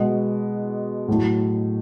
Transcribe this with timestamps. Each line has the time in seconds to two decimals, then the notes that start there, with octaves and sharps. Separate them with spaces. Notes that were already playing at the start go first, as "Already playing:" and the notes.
Already playing: B2 G#3 B3
1.08 A2 F#3 A3